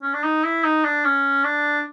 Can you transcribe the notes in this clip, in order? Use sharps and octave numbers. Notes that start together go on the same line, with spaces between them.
C#4
D4
D#4
E4
D#4
D4
C#4
D4